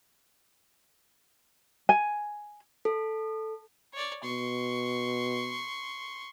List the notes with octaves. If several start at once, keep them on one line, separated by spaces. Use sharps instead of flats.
G#5
A4
C#5 D5
B2 C6 C#6